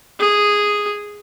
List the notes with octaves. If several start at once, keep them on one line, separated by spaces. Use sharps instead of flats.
G#4